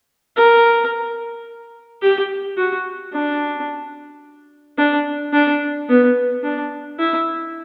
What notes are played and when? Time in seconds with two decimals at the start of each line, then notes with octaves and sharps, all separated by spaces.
0.36 A#4
2.02 G4
2.58 F#4
3.13 D4
4.78 D4
5.33 D4
5.89 B3
6.43 D4
6.99 E4